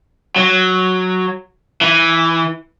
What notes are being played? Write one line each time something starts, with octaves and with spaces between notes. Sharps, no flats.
F#3
E3